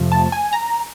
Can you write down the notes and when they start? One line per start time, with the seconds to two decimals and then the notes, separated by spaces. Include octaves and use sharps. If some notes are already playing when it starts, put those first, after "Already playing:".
Already playing: F2 C3 F3 A3
0.12 A5
0.32 G#5
0.53 A#5